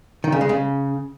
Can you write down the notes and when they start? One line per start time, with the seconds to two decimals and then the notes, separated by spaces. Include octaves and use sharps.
0.24 D#3
0.32 C#3
0.41 G#3
0.49 C#3